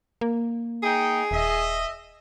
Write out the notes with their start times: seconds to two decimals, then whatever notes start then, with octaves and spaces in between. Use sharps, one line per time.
0.21 A#3
0.83 D#4 G#4 G5
1.31 D#1 D#5 E5